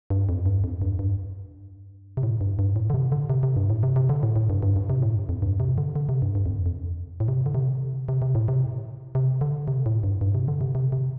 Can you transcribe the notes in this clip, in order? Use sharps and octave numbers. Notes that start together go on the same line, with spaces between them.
G2
F2
G2
F2
G2
G2
C3
A2
G2
G2
A2
D3
C3
D3
C3
C3
G2
A2
C3
C3
D3
A2
A2
G2
G2
G2
C3
A2
F2
G2
C3
D3
D3
C3
G2
G2
F2
F2
A2
C3
D3
C3
C3
C3
A2
C3
C3
D3
C3
A2
G2
G2
C3
D3
C3
C3
C3